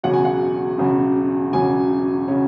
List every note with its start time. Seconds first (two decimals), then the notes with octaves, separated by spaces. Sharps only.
0.04 E1 E2 C#3 F#3 C#4 F#5
0.13 G#5
0.25 F#5
0.78 E1 E2 C#3 F#3 C#4
1.53 E1 E2 C#3 F#3 C#4 G#5
2.28 C#3 F#3 C#4